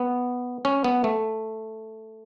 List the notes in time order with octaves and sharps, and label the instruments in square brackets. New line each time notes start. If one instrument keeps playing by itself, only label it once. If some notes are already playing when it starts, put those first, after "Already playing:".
Already playing: [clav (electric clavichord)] B3
C#4
B3
A3